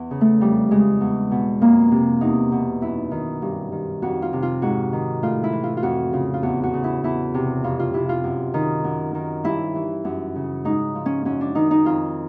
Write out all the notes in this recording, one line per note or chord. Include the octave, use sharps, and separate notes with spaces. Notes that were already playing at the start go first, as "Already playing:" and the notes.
Already playing: E2
C#3
A3
F2 G3
C#3 G#3
E2
B2
F2 A#3
C3 C4
E2 D#4
B2
F#2 E4
D#3
G2
D#3
F2 F#4
F4
C3
F4
G#2 F#4
D#3
A2 F4
E4
E3
F4
F4
F2 F#4
C#3 F4
F4
E2 F#4
F#4
C#3
E4
E2 E4
C3
F2 F4
F4
C3 E4
F4
F#2
D#3
F#2
D#3
G2 E4
E3
F#2
C#3
G#2 D#4
F3
C#4
F#2 C#4
D4
D#3 D#4
D#4
F2 F4